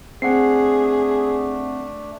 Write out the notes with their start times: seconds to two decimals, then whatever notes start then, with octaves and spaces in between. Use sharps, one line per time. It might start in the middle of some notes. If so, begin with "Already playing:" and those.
0.22 A3 C4 D4 G#4 F#5 C7